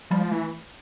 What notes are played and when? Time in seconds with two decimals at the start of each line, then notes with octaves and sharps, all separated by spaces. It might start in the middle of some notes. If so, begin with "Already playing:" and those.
0.11 F3 G3
0.21 G#3
0.31 E3 A3